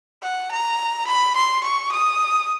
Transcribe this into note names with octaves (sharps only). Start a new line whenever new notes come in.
F#5
A#5
B5
C6
C#6
D#6